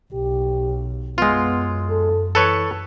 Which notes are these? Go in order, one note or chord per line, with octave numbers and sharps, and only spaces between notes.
B1 G4
F#2 G#3 B3 F4
A4
E3 A4 B4 C#5